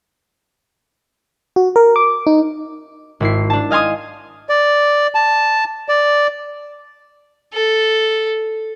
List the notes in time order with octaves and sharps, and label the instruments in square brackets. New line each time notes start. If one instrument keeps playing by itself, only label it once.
[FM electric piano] F#4
A#4
D6
D#4
[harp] G#1 E4 C7
D4 A5
D#5 F5 G#5 C6 D#6
[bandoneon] D5
A5
D5
[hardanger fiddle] A4